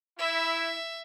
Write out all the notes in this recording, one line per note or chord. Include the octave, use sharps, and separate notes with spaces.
E4 E5